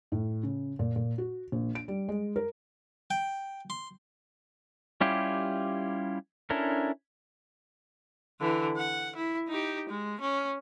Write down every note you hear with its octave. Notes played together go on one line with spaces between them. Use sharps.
A2
C#3
A#2
A#2
F#4
A#1
D7
G3
G#3
A#4
G5
C6
G3 C#4 E4 F4 G4
C#4 D4 E4 A4 A#4
D3 E3
F#5
E4
D#4 G4
G#3
C#4